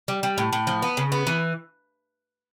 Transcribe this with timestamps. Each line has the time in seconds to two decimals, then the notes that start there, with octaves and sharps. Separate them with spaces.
0.08 G3
0.23 G3
0.38 A2
0.53 A2
0.67 F3
0.82 B3
0.97 C#3
1.12 B3
1.27 E3